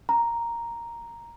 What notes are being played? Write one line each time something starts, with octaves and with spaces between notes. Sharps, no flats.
A#5